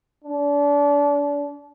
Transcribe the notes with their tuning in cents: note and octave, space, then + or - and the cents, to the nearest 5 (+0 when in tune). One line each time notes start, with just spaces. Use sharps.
D4 -30